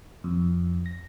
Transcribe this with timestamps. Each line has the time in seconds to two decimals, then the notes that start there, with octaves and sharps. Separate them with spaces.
0.24 F2
0.86 A#6